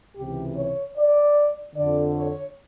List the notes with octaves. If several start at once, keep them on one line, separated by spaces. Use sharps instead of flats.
C#2 C3 E3 G4
C#5
D5
F2 D3 D5
C#5